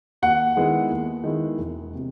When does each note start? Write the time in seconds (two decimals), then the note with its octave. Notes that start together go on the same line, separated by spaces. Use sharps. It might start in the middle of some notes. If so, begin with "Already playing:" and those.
0.22 D#2 F#5
0.57 D#3 G#3 B3 E4
0.90 D#2
1.24 D#3 G#3 B3 E4
1.58 E1
1.95 C3